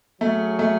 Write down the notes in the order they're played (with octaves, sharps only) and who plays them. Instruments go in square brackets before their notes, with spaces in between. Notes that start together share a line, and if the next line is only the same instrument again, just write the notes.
[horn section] F#3 C#4 G#4 [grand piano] A3
[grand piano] A3